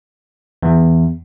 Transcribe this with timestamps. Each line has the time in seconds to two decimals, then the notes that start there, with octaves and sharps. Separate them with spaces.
0.63 E2